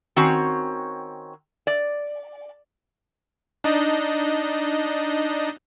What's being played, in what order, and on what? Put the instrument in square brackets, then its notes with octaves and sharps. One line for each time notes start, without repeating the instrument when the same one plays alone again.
[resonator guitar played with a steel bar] D#3 C4 C#4 F#4
D5
[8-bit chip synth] D4 D#4 D#5